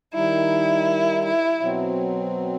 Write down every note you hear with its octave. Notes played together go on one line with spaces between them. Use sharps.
D#3 G3 D#4 E4
E4
B2 F#3 C4